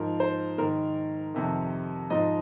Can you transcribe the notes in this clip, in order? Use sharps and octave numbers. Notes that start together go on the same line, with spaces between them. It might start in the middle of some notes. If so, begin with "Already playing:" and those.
Already playing: G#2 F3 A#4
C5
G#2 D#3 A#4
F2 C3 D#3
G#2 F3 D#5